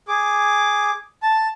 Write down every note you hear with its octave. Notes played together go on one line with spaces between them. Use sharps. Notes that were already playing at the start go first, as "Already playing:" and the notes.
G#4 D6
A5